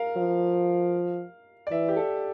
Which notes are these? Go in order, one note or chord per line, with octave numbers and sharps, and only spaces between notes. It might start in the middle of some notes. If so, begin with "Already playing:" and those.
Already playing: A#4 F5
F3
D5
E3 E5
G4
A4